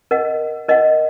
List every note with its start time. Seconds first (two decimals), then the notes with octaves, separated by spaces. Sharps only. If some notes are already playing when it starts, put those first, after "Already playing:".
0.11 A#4 D#5 F#5
0.68 A#4 D#5 F#5